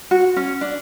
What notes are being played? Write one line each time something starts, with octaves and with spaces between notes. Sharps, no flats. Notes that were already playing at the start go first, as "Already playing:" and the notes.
F#4
C#4
D4